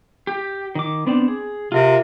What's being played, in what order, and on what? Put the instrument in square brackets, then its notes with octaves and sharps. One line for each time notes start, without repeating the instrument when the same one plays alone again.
[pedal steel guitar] G4
D#3 D6
B3 C4 D4
G#4
[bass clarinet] C3 [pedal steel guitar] F4 A#4